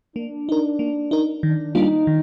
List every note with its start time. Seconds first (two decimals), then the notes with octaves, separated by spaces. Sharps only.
0.16 A#3 D4
0.49 D#4 A#4
0.79 A#3
1.11 D#4 A#4
1.43 D#3 D4
1.75 G3 A#3 D4 D#4 F4
2.07 D#3